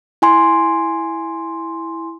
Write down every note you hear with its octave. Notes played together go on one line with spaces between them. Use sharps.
E4 G#5 C6